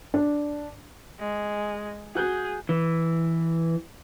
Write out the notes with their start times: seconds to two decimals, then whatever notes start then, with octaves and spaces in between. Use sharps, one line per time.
0.14 D4
1.20 G#3
2.15 F#4 G#4 F#6 G6
2.69 E3